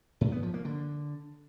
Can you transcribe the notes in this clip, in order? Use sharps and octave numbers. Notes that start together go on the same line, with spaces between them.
G#2
B3
F3
A#3
D3